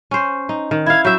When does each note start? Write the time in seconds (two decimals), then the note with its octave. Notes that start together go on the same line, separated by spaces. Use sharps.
0.11 C#4 C5
0.49 D#4
0.71 D#3
0.86 E4 F5 G#6
1.05 F#3 E5 G6